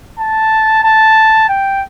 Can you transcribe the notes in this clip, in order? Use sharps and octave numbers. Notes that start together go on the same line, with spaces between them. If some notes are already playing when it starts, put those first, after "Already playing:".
A5
A5
G5